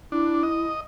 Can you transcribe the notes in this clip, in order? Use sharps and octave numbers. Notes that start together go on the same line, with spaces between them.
D4 E4
D#5